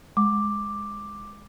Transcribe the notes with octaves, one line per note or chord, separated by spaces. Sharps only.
G#3 D6